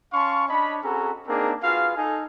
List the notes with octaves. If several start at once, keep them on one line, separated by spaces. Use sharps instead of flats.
C#4 F5 A5 C6 C#6
D4 C#5 D#5 A5 B5
C4 C#4 F#4 G#4 A4 A#5
A#3 C4 D4 D#4 G#4 A#4
F4 F#4 G#4 B4 F5
D#4 A4 G#5